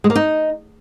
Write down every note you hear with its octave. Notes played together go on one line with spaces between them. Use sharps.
G#3
A#3
D#4